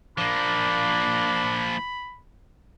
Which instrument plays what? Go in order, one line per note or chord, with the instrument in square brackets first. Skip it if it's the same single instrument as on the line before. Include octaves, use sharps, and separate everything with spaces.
[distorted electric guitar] F3 A#3 [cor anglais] D4 [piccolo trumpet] B5